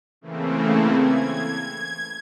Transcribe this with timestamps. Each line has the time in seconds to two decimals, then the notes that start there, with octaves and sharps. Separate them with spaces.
0.21 C#3 E3 A3 A#3 C4
0.97 G#6